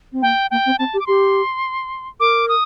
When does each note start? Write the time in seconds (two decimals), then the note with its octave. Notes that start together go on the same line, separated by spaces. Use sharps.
0.12 C4
0.22 A#3 G5
0.51 A#3 G5
0.65 C4
0.79 C4 A5
0.93 G4
0.99 D6
1.06 G4 C6
2.20 A#4 D6
2.49 D#6